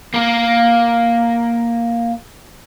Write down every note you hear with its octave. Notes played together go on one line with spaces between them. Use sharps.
A#3 A#4